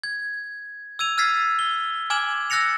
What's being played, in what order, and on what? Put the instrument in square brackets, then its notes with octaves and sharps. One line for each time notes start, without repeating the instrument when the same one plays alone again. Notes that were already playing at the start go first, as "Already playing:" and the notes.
[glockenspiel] G#6
E6 G#6 D#7 F7
E6 F6 G#6 A6 B6 C7
G7
G#5 D6 F6 G#6 E7 F#7
E6 F#6 A6 A#6 C#7 F7